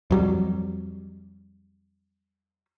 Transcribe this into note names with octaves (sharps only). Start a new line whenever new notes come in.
F2 F#3 G3